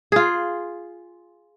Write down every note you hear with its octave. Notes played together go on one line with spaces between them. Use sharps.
F4 G#4